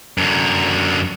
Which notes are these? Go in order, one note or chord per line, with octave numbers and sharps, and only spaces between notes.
F#2 D3